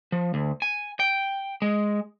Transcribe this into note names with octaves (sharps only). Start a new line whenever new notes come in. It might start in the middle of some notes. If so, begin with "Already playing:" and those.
F3
D2
G#5
G5
G#3